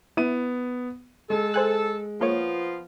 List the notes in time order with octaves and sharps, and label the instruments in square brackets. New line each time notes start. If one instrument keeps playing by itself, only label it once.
[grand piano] B3 D#7 [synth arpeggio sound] E4
[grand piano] G#3 [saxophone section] A4
[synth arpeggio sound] C5 G#5 F#6
[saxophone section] F3 B3 F4 [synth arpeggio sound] A#3 C#5